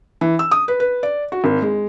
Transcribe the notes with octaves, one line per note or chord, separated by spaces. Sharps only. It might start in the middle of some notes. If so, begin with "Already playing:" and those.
E3
E6
D#6
B4
B4
D5
F#4
G#1
G#3